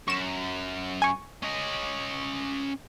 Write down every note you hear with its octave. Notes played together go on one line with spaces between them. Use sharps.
F#2 C#6 E7
G#5 C#6
C#4 D#5